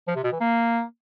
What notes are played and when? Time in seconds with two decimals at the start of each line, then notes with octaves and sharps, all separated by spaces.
0.08 F3
0.16 C3
0.24 B2
0.32 E3
0.40 A#3